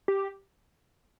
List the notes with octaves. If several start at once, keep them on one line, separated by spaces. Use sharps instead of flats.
G4